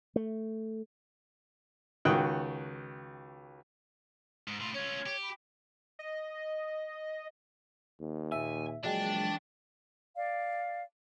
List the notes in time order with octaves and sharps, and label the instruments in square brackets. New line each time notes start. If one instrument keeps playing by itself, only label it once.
[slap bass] A3
[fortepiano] C#2 D#3 F#4 G5 D#6 F#6
[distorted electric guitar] G#2
[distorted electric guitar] A2 F4 [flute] C6
[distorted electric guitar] C#4 F4 [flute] C#5
[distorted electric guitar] G4
[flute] B5
[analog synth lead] D#5
[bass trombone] D#2
[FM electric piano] A#2 E5 [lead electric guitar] G#5
[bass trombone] A#1 [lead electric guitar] E3 G5 [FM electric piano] F#3 G#3 [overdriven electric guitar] D4
[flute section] D5 F5